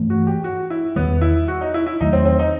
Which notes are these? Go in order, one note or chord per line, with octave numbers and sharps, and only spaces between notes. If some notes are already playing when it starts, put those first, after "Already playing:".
Already playing: G2 E3 A3
F#4
G4
F#4
E4
E2 D#3 G3 B3
E4
F#4
D#4
E4
E4
E2 D#3 F#3 A3 D#4
C4
C4
D#4